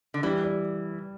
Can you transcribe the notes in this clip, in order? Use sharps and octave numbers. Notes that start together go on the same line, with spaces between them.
D3
E3 G3
G3